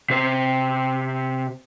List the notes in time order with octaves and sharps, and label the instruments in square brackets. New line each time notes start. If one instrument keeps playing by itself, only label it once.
[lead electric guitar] C3 C5